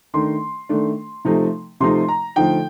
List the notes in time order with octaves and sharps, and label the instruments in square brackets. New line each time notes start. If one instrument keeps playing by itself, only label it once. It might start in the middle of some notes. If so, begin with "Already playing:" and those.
[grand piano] D#3 A3 D4 C6
D#3 A3 D4
C3 F3 A3 D#4
C3 F3 A3 D#4 C6
A#5
D3 F3 A3 D#4 G5